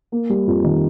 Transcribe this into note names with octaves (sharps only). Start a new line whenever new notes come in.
A#3
G3
F2
D#3